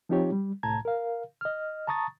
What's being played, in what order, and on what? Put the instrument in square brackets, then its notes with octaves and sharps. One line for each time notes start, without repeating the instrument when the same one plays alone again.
[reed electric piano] F3 C4 D#4 F4 G4 C#5
G3
C2 A2 A5 A#5 G#6
A#4 F5
D#5 F6
A5 A#5 C#6 D#6 A6